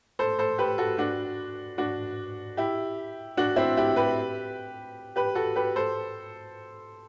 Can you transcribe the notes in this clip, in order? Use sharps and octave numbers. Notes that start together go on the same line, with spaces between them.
A4 C5
A4 C5
G4 B4
F#4 A4
D4 F#4
D4 F#4
E4 G4
D4 F#4
C4 E4
E4 G4
G4 B4
G4 B4
F#4 A4
G4 B4
A4 C5